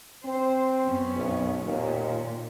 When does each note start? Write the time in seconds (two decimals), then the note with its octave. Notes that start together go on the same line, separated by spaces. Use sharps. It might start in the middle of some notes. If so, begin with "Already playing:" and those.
0.25 C4 C5
0.84 F#2 B3 C#4
1.16 B1
1.64 D#2 A#2